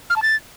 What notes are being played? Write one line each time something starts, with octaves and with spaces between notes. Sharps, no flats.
F6
A5
A6